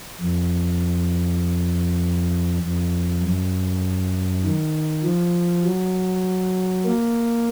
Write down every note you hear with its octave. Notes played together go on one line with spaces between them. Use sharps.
F2
F2
F#2
D#3
F3
F#3
A#3